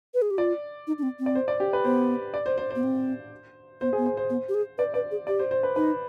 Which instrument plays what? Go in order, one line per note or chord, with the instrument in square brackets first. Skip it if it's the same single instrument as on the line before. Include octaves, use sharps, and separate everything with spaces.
[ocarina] B4
G#4
G4
[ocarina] F4 [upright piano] D5
[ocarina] D#4
D4
C4
C4
[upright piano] D5
C5
D5
G4
B4
[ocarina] B3 [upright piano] C5
[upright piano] D5
C5
C5
C5
[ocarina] B3
C4
[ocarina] B3 [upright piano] C5
[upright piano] G#4
[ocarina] B3
[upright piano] C5
C5
[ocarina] B3
G4
G#4
[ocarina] B4 [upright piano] D5
[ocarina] B4 [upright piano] D5
[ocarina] G#4
[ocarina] G4 [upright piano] D5
[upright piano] C5
C5
B4
[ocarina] D#4 [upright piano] B4